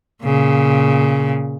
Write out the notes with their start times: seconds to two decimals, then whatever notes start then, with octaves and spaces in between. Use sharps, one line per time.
0.23 A#2 C#3